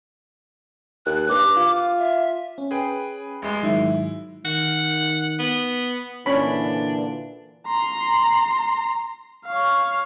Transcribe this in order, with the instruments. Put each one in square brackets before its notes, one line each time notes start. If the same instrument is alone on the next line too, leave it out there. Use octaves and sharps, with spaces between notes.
[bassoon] D#2 [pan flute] F#6
[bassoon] G2 [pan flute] D6
[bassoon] F4
[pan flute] E5
[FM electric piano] C#4
[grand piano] G#4 B4 G5
A1 G#3
[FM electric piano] G#2 D#3 F#3 [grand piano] E4
[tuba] D#3 [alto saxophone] F#5
[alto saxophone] B3
[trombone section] A#2 D3 E3 [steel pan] C#4 C#5 B5 [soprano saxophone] D4
[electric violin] A#5 C6
C#5 F5